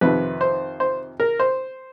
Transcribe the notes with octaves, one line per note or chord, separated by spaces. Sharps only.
F2 C3 D#3 B4
C5
C5
A#4
C5